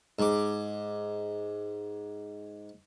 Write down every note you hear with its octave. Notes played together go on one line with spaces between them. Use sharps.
G#2 D6